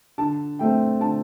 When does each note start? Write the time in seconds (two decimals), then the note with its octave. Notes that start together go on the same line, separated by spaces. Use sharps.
0.18 D3 A5
0.59 A3 C4 G5
1.01 D3 A5